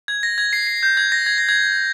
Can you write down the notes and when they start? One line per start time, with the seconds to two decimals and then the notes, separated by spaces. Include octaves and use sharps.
0.08 G#6
0.23 A#6
0.38 G#6
0.53 C7
0.67 C7
0.83 G6
0.97 G#6
1.12 A#6
1.26 G#6
1.38 A#6
1.49 G#6